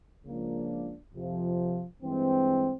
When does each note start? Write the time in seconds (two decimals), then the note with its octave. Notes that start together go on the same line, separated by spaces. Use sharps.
0.23 C#2 C#3 F3 A#3 D4
1.14 F2 C3 F3
2.02 G2 E3 G#3 C4